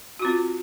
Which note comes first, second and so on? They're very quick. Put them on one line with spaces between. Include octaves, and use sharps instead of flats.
F#4 F4 C4